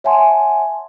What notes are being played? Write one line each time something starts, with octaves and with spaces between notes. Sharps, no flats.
C#5 E5 F#5 G#5 A5 C6